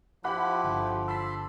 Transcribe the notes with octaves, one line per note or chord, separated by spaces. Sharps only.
F3 E4 G4 F#5 B5 F#6
G1 D3
A5 B5 C6 E6 B6